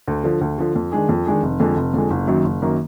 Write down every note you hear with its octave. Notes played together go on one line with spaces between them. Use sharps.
D2
D3 F3
D2
D3 F3
F2
D#3 G#3 D4 G#4
F2
D#3 G#3 D4 G#4
F1
F2 D3 G#3
F1
F2 D3 G#3
F#1
F#2 D#3 F#3 A#3
F#1
F#2 D#3 F#3 A#3